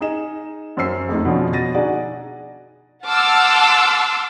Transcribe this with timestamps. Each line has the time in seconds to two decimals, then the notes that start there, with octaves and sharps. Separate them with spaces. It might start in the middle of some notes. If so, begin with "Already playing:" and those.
0.01 D#4 G#4 D#5 E7
0.77 F#2 C5 E6 C7
1.09 F2 A3 D#4
1.25 B2 D3 F3 C#4
1.52 B2 A6 A#6 D#7
1.74 D4 D#4 F#4 G#4 D5
3.07 F#5 A5 C6 D6 E6 F6